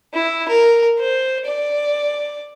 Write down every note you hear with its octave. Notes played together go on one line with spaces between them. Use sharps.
E4
A#4
C5
D5